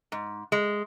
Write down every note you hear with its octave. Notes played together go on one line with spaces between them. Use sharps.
G#2
G#3